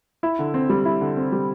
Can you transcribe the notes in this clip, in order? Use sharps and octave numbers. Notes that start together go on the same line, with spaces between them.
E4
D3
C4
G3
E4
D3
C4
G3